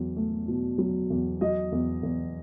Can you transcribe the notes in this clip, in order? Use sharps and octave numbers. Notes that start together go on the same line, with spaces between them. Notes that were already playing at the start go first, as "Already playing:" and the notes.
Already playing: E2 F#3
A3
B2
F#3
E2
F#3 D#5
E2
E2